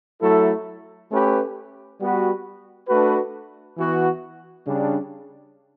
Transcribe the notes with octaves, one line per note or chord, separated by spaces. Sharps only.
F#3 A3 E4 A4
A3 C#4 G4 B4
G3 B3 F#4 B4
A3 D4 F#4 B4
E3 B3 F#4
C#3 G3 D4